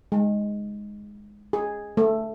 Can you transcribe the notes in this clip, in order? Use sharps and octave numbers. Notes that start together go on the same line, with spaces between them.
G#3
G#4
A3